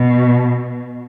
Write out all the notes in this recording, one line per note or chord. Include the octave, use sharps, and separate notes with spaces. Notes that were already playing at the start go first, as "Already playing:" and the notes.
Already playing: B2